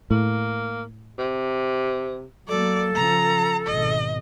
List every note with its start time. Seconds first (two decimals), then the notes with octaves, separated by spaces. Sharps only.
0.11 A2 A#3
1.19 C3
2.49 F#3 A#3 A4 D5
2.95 C#3 F3 A#5
3.67 G#1 B2 D#5